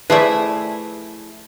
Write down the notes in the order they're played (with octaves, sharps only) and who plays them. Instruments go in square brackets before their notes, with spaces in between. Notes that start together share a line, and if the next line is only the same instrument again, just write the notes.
[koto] F3 A3 [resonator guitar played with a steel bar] E4 G#4 E5 [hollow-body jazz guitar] B4 D5